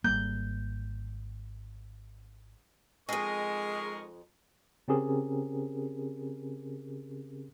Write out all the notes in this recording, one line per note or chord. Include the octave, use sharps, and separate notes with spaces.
G#1 G3 A#3 G6
F2 G#3 D#4 G#4 A#4 D#5 C#6
C#3 C4 C#4 G4 G#4 A#4